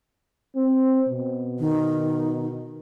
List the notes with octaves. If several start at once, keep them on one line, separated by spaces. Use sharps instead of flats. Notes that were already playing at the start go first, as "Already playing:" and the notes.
C4
B2
D#3